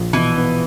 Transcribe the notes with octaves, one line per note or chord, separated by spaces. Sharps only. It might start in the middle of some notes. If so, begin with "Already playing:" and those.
Already playing: A#1
B2 E3
B3